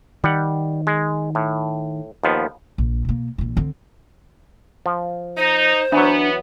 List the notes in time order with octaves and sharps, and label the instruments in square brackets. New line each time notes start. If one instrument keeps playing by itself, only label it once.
[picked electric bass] D#3 [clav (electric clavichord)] G3 F#5
[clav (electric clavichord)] G#3
A2
D#2 F3 B3
[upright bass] A#1
B2 A#3
A#1 E3
D3 C4
[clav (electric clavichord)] F3
[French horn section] D#4 [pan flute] C5
[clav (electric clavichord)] E3 F#3 [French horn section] B3 [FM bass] D4